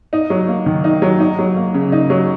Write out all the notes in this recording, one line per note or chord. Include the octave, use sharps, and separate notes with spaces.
D#4
F#3
A#3
D#3
D#4
F#3
D#4
F#3
A#3
C#3
D#4
F#3